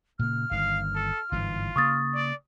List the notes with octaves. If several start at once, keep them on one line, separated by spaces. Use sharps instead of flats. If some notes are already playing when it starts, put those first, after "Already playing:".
A#2 C#3 A#3 F6
G1 D#3 F5
A4
G1 G#2 E3 F4
C#3 A#3 C#6 D#6 A6
D5